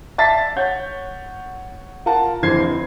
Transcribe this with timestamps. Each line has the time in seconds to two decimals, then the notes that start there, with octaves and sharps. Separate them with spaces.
0.18 D5 E5 A5 A6 B6 C7
0.56 C#5 F#5 G6
2.06 F4 A#4 F#5 A5
2.43 F1 D3 E3 C5 G#6 C7